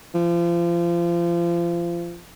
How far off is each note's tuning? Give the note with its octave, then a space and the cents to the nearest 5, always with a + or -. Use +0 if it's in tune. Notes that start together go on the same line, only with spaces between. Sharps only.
F3 -30